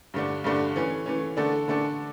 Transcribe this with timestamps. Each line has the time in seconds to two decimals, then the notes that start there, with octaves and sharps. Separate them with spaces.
0.14 G2 D3 A3 D4
0.44 G2 D3 A3 D4
0.76 E3 A3 C#4
1.06 E3 A3 C#4
1.37 D3 A3 D4 A4
1.68 D3 A3 D4 A4